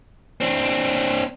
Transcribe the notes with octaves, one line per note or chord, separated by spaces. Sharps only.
C4 D4